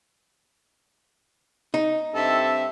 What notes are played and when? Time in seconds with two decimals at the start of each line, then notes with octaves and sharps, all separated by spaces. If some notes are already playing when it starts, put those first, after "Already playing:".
1.74 D#4
2.15 G2 C4 A4 E5